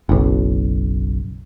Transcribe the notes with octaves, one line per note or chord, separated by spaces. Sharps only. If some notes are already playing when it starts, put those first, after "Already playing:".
F#1 B1